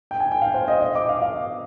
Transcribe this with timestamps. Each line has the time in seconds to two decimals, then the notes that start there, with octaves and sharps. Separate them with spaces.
0.11 G5
0.20 G#5
0.32 G5
0.42 F5
0.54 C5
0.68 D#5
0.81 D#5
0.95 D6
1.09 F5
1.22 F5